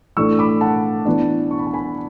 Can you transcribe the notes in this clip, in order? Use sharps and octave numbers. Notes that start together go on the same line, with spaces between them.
A2 E3 A3 D4 C#6 E6
B5 D6
F#5 A5
E3 B3 D4
C#6
B5
A5
G#5 B5